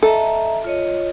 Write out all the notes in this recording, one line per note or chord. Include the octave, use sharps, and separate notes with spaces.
A4 D#5 E5 A#5
F4 C#5 D#5